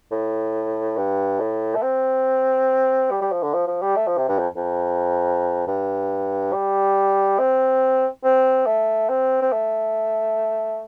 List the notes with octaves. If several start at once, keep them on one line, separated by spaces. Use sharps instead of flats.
A2
G2
A2
A3
C4
G3
G3
F3
D3
F3
F3
G3
A3
F3
C3
G2
F2
F2
G2
G3
C4
C4
A3
C4
C4
A3